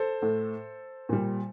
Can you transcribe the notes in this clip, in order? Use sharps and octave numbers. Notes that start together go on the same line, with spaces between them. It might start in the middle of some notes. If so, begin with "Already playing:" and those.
Already playing: A4 C5
A2 A3
A#2 G3